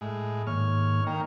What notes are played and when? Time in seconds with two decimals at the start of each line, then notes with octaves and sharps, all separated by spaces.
0.01 A2 G#3
0.47 G#2 D#3 A#3 C#5 F6
1.07 D#3 A#3 G5 A#5 C#6